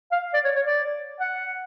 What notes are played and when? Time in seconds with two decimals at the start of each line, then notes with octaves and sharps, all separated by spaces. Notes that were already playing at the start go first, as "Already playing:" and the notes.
0.12 F5
0.34 D5
0.44 C#5
0.55 C#5
0.66 D5
1.20 F#5